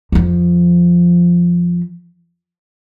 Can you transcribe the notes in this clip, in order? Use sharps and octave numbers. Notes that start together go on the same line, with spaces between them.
F2 F3